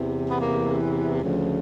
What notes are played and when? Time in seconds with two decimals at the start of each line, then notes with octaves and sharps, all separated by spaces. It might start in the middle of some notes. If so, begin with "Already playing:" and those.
Already playing: E2 C3 E3
0.30 B3
0.41 A#3
1.22 D2 C#3 F3